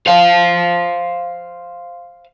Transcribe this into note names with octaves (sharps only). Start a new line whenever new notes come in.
C5 F5